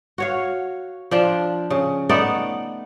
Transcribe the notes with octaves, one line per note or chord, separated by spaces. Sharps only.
F#4 C#5 F5
F3 D4 F4
C#3
A3 B3 D#4 D5